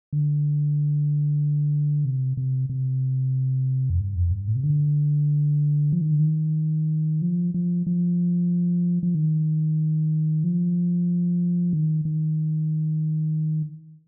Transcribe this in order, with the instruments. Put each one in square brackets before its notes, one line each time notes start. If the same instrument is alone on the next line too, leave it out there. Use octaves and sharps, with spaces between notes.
[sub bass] D3
C3
C3
C3
F2
G2
F2
G2
A2
C3
D3
F3
D#3
D3
D#3
F3
F3
F3
F3
D#3
F3
D#3
D#3